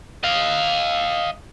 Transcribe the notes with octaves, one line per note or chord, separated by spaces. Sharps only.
D#5 F5